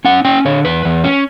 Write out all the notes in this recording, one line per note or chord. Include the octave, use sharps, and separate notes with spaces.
C#4 F#5
C#4 G5
D3 C#5
E2 B4
E2
C#4